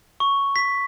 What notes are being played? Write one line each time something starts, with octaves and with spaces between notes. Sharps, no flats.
C#6
B6